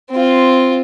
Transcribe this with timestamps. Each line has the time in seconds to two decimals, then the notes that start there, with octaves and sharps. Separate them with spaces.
0.10 C4 F4